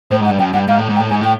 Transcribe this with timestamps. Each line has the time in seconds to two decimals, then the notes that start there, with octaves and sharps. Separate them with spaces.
0.11 A2 C5
0.20 G#2
0.25 F#5
0.30 G2
0.39 F#2 G5
0.53 G2 F#5
0.68 G#2 F5
0.78 A2
0.89 G#2
0.96 G5
1.00 A2
1.10 G#2 G#5
1.21 A2 G5